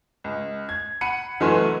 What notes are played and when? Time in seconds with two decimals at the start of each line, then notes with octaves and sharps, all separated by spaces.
0.24 C#2
0.69 G#6
1.01 F#5 B5 C#7 D#7
1.40 F#1 E3 F#3 A3 G#5 C6